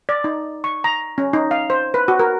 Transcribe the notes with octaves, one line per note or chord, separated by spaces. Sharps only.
D5
D#4
C#6
A#5
C#4
D#4
F5
C5
B4
F#4
A#4